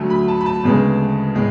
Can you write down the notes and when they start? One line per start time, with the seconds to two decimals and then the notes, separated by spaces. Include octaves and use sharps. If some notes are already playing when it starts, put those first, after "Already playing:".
Already playing: D2 D3 F#3 A3
0.10 B5
0.28 A5
0.41 B5
0.46 A5
0.64 D2 C#3 G#3 B3
1.35 A2 G#3